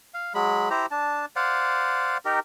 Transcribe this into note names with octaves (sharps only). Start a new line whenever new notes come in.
F5
F#3 G#3 B5
E4 G4 C5 A#5
D4 A5
C5 D5 F5 F#5
D#4 G4 A#4